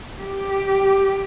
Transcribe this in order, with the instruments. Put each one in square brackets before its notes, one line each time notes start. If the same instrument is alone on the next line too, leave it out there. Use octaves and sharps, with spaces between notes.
[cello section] G4